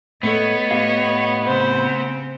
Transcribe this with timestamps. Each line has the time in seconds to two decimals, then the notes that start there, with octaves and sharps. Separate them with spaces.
0.23 A2 B3 A4 C#5 D#5
0.71 A2 G4 F5
1.45 C#3 C4 C5